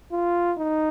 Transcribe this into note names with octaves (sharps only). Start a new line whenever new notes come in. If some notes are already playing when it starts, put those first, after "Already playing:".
F4
D#4